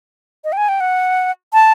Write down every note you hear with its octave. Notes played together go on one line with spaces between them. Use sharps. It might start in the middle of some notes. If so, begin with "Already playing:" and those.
D#5
G5
G#5
G5
F#5
A5